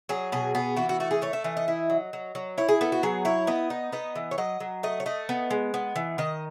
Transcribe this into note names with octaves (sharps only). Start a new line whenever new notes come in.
F#3 G#4
B2 G#4
B3 G#4
E3 F#4
F#4
A3 F#4
G#4
A3 C#5
E5
E3 D#5
D#5
E4
F#3
F#3
F#3
E4 C#5
G#4
B3 A4
F#4
F#3 G#4
E4 C#5
B3 D#5
D#4
B3 D#5
E3
C#5
F#3 D#5
F#3
A3 D#5
C#5
A3 D#5
B3
G#3
B3
E3
D#3 D#5